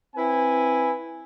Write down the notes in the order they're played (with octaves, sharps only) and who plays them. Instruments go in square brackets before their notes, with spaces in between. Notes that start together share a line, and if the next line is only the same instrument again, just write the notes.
[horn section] C4 E4 B4 G#5